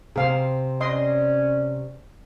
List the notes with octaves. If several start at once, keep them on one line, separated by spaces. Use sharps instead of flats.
C3 C4 G#4 F5
C#4 D5 D#5 C6